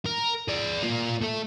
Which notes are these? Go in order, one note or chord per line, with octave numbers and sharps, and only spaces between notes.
A#4
G#4 D5
A#3 F4
A3 A4